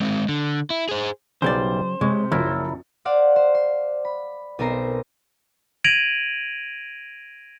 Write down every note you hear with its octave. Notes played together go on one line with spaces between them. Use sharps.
G#3 C4
D3
E4
G#4 C5
B1 C#3 F#3 G3 C5 D5 G5
C3 G#3 C#5
A#1 F#2 C#3 F3 E4 A#4
C5 D5 F5 F#5
C5
C6
B5
B1 B3 C4 A#4 A#5 C7
G#6 A#6 D7 D#7 F7 F#7